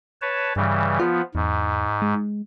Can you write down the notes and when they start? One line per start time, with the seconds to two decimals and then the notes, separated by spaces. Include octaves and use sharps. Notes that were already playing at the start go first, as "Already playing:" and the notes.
0.22 B4 C#5 A5
0.56 G2 C#3 E3 G3
1.00 F3 B3 F4
1.35 E2 G#2
2.02 G#3